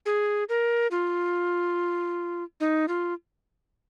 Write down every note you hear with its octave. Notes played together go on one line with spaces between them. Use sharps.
G#4
A#4
F4
D#4
F4